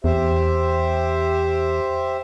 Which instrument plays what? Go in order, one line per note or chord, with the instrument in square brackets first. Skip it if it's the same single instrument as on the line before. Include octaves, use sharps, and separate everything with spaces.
[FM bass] E2 [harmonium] G4 C5 E5